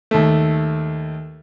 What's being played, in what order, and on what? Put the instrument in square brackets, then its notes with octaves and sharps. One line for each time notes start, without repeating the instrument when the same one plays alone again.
[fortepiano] D#2 A3